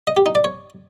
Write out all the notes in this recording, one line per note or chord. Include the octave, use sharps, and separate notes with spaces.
D#5
G4
D#4
D5
C#5